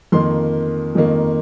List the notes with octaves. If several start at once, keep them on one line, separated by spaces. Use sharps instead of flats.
F2 D#3 A#3 C6
F2 D#3 A#3